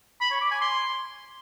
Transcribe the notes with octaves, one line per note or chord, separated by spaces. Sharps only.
B5
C#5
D6
G#5
C6